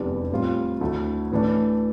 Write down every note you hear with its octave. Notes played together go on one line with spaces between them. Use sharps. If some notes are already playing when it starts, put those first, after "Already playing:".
Already playing: F1 E2 E3 G3 D4
A2 G3 C4 F4
D2 D3 A3 E4
A2 E3 A3 D4